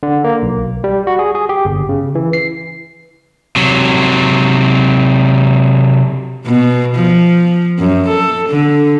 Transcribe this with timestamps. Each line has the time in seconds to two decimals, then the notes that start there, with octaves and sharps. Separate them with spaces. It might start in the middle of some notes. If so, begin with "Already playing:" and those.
0.03 D3
0.24 A#3
0.42 B1
0.84 G3
1.07 F#4
1.19 G#4
1.35 G#4
1.49 G4
1.65 G1
1.89 C#3
2.15 E3
2.33 C7
3.56 C3 F#3
6.46 B2
6.96 F3
7.78 F#2
8.08 A4
8.49 D3